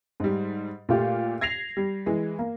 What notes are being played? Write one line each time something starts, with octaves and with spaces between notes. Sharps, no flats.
G#2 G3
A#2 A3 F4 G4
G#6 A#6 C7 F7
G3
E3 G#3
A#3